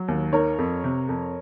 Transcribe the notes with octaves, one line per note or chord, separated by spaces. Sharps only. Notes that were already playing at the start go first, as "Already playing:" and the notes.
Already playing: F#3
D#2
D#3 A#4 C#5
F2
C3
F2